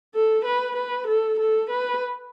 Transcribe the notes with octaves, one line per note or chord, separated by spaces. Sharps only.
A4
B4
B4
A4
A4
B4